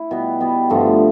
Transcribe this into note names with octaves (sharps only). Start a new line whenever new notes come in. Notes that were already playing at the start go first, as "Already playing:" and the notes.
Already playing: E4
B2 G3 B3
B2 G3 B3
G2 D3 F3 A3